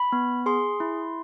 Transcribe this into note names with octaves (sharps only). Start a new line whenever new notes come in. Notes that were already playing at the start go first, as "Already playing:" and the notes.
Already playing: B5
B3
G#4 C6
E4